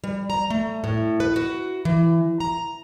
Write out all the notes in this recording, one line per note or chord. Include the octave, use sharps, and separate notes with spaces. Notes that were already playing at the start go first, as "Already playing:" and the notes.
G3
A#5
A3
A2
B4
F#4
E3
A#5